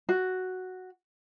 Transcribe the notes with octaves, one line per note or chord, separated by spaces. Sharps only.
F#4